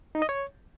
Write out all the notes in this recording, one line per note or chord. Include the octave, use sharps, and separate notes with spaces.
D#4
D#5
C#5